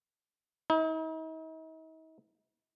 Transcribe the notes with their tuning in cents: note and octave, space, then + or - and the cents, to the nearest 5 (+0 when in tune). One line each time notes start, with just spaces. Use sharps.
D#4 +45